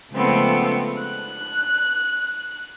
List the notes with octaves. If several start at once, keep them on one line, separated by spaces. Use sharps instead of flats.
C#3 F3 G#3 A3 B3 C4
F#6